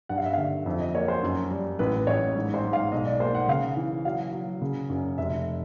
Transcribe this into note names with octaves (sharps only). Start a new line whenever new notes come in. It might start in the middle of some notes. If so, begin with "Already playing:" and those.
G2 F#5
F5
E5
D3 F5
F2 E5
D#5
A#3 C#5
C5
F#2
G3
A1 B4
A1 C#5
G#2
C5
G#2
F5
B1 D#5
D5
A#3 C5
F#5
C#3 F5
E3
F#3 F5
F#3
C#3
F#2
F1 E5